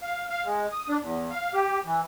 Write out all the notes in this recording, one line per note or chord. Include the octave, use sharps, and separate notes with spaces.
F5
F5
G#3
D#6
D4
E2
F5
G4
E3